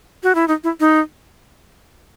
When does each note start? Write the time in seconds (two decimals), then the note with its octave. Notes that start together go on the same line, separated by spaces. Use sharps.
0.23 F#4
0.35 E4
0.48 D#4
0.64 E4
0.80 D#4